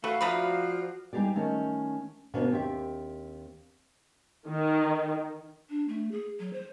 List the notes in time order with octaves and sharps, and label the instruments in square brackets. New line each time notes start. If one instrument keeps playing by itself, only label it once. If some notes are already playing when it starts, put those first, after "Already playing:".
[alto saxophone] A3 [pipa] F#4 [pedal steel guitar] A4 B4 F#5 [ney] F5
[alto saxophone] F3 [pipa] A3 D#4 B4 [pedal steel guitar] F#4 D5
[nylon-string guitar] G3 D#4 E4 G4 G#4 D5
D#3 A3 C#4 D#4
D2 B2 A#3 C#4 D4
D#2 C4 G4 E5
[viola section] D#3
[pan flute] D4
A3
G#4
F#3
C5